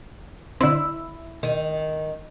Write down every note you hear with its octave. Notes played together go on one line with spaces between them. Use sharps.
D3 C4 E4
D#3